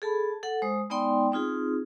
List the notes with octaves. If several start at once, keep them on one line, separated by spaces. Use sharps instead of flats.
G#4 A4 A5 B5
A4 F#5
G#3 C5 D#6
G#3 B3 D#4 D5 G5 C6
C4 D#4 F4 G#4